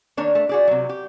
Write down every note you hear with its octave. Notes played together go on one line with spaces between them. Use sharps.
D#3 A#3 D4 C#5
A3
F#4 G#4 D5
C3 F#3
G4